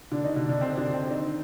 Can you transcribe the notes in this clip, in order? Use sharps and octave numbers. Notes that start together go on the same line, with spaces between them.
D3 D4
D#3 D#4
D3 D4
D3 D4
C4
D3 D4
C4
D#3 D#4